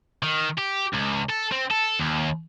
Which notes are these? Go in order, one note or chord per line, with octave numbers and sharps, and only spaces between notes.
D#3
G4
C#2
A4
C4
A4
D#2